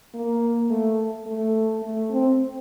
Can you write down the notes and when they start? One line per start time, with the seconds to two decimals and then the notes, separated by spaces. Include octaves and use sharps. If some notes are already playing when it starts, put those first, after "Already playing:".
0.14 A#3
0.70 A3
1.26 A3
1.82 A3
2.11 C4